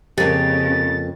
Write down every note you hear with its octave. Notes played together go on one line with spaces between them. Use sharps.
F2 C#3 A#3 G4 A6